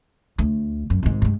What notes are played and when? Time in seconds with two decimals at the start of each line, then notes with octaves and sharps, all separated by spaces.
0.38 D2
0.90 F#2
1.03 G#1 G#2
1.22 G2 G#3